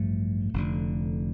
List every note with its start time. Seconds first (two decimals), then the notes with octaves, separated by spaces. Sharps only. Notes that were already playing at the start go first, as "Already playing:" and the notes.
Already playing: A1 G2 F3 A3
0.53 F1 F2 D3